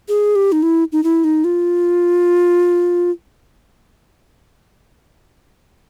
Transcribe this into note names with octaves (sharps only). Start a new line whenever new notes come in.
G#4
G4
D#4
E4
D#4
E4
D#4
F4